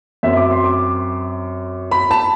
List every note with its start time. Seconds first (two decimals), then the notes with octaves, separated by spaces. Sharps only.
0.23 F#2 F#3 C4 E5
0.36 D6
0.51 C6
0.64 D6
1.91 B5
2.11 A5